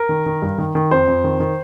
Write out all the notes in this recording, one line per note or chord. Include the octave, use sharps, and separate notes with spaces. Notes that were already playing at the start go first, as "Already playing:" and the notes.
Already playing: A#4
D#3
D#3
G2
D#3
D#3
F2 C5
F2
D#3
D#3